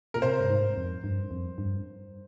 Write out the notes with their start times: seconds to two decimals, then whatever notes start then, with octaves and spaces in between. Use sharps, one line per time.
0.14 A#2 A#4
0.22 C3 C5
0.40 G2
0.50 G#2
0.77 F2
1.04 G2
1.31 F2
1.58 G2